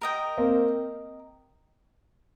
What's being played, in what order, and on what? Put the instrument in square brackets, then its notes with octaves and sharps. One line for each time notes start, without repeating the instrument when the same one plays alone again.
[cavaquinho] A#4 D#5 G5
[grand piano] A#3 C4